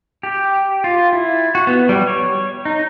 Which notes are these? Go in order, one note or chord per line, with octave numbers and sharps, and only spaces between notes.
G4
F4
E4
F#4
B3
G3
C#5
D#4